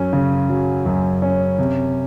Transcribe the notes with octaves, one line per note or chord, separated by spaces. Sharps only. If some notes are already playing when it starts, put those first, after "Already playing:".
Already playing: F#2 F#3 C#4
C#3
F#3
F#2
C#4
C3